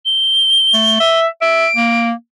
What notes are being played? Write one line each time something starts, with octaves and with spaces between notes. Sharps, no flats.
G7
A3
E5
E5 D7
A#3